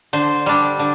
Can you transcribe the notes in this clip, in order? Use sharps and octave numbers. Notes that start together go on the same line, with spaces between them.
D3 C5
G3 D4
D3